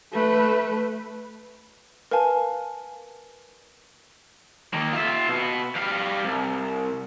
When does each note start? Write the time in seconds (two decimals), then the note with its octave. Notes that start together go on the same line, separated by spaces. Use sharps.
0.13 A3 B4
2.11 A#4 B4 F5 G#5 A5
4.74 D#3 A#3
4.93 F4 E5
5.29 B2 B3
5.76 G3 F5
6.25 C2